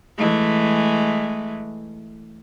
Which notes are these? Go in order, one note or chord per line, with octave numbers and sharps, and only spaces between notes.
E3 G#3 A3